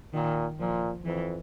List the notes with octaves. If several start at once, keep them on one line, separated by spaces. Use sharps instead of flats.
A#2 D#3
A#2 F3
F2 E3